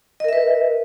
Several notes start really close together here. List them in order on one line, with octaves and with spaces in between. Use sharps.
D#5 A#4 E5 B4